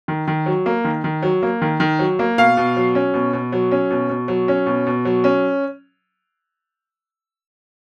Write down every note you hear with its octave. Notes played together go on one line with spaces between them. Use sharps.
D#3
D#3
F#3
A#3
D#3
D#3
F#3
A#3
D#3
D#3
F#3
A#3
B2 F5
B2
F#3
C#4
B2
B2
F#3
C#4
B2
B2
F#3
C#4
B2
B2
F#3
C#4